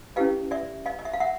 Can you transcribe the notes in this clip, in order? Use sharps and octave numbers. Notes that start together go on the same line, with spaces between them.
C#4 E4 G4 B4 D#5 F5
D5 E5
D#5 F5
D#5
E5
F5
E5 F#5